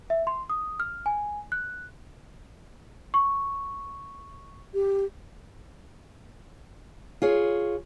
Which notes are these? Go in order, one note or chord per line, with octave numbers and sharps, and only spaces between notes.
E5
C6
D#6
F6
G#5
F#6
C#6
G4
F4 G#4 C#5